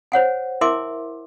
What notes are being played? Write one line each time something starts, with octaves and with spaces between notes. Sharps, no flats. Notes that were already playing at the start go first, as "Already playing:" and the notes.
C5 C#5 F#5 G#5
E4 A#4 E5 G#5 C6 D6